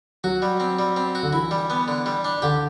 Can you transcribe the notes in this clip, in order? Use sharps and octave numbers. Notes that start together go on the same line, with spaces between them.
F#3 F#4
G3
C4
G3
C4
F#4
D3
E3 E4
G3
B3
D3
G3
D4
D3 G4